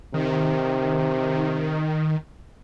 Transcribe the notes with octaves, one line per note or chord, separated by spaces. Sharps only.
C3 D#3